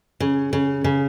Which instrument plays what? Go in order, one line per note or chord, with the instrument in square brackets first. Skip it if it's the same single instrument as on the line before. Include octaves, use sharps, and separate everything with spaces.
[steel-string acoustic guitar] C#3
C#3
C#3